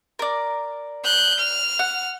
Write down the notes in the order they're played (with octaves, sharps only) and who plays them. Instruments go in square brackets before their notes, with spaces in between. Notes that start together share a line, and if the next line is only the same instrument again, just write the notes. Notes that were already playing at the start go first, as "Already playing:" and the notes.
[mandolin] A#4 D5
[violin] F#6 G6
F6
[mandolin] F#5